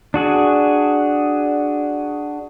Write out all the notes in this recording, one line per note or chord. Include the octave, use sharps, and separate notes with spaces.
D4 F#4 G#4